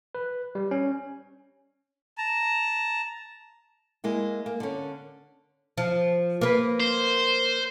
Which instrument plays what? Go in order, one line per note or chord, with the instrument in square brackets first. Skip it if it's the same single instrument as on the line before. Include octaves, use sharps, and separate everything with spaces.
[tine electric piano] B4
G3
C#4
[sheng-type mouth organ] A5 A#5
[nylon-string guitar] G#3 A#3 E4
A#3
D3 C#4
[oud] F3
A#3 B4
[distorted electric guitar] C5